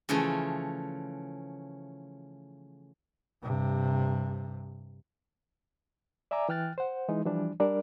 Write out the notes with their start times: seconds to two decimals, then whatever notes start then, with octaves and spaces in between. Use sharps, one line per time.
0.09 C#3 E3 F3 A3 C#4
3.43 G2 C3
6.31 D5 E5 G#5 A#5 D6
6.49 E3 G5 F6 F#6 A6
6.78 C5 F#5
7.08 E3 G#3 D#4
7.26 E3 F3 G3 D4
7.60 G3 D4 A#4 D5